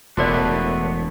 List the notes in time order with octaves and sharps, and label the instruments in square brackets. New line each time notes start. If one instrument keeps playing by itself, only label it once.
[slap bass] E1 A2 [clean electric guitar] A3 B3 D4 [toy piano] F#4 A#4 D5